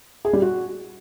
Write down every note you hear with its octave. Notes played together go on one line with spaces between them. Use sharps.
G#4
G3
F#4